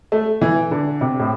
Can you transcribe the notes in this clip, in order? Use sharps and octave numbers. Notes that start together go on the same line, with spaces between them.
A3
E3
D3
C3
A2